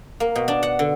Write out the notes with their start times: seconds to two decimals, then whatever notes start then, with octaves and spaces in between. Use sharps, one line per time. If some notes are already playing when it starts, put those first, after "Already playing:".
0.20 A#3
0.35 B2
0.48 D4
0.63 F#5
0.79 D3